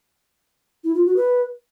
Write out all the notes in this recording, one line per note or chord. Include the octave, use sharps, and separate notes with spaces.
E4
F4
F#4
B4